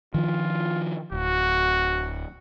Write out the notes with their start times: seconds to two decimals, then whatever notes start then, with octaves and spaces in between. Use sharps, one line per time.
0.14 D#3 F3 F4
1.12 D1 F#4